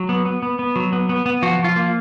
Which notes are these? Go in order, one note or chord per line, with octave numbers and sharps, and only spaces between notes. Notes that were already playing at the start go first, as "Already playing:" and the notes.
Already playing: F#3
B3
B3
B3
B3
F#3
B3
B3
B3
F3 F#4
F3
F4
A#3